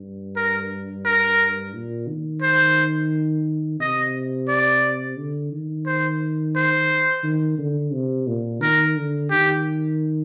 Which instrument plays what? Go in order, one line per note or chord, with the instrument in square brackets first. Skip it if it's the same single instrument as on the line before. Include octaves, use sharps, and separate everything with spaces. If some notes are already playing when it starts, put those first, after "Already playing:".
Already playing: [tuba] G2
[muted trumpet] A#4
A#4
[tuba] A#2
D#3
[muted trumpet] C5
[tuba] C3 [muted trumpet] D#5
[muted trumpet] D5
[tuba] D3
D#3
[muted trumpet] C5
C5
[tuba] D#3
D3
C3
A#2
[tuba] D#3 [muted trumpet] A#4
[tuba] D3
[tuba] D#3 [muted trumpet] G4